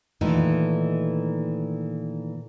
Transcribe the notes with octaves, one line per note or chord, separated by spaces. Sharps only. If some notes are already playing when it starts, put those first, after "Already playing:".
A#2 D#3 E3 A3 D#4